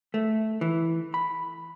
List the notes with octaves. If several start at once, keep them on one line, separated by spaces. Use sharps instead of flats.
A3
E3
B5